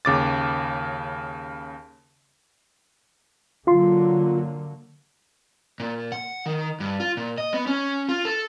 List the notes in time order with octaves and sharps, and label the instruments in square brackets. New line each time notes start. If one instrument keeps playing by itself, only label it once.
[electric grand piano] D#2 C#3 D6 A6
[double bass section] D3 F#3 A#3 [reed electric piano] F4 C6
[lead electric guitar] A#2
F#5
D#3
G2
F4
A#2
D#5
B3
C#4
F4
A4